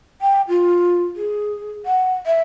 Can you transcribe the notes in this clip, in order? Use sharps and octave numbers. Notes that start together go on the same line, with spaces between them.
G5
F4
G#4
F#5
E5